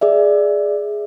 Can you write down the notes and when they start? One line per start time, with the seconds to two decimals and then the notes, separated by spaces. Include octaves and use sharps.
0.01 G#4 D5 E5